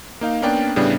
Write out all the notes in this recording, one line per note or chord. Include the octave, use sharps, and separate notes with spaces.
A#3 D#4 F5
A#3 B3 C#4 D4 D5 G5
A2 C#3 G3 B3 D4